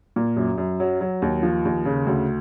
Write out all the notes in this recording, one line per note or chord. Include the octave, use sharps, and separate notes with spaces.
A#2
F#2
F#2
F#3
F#3
D#2
F3
D#2
C#3
D2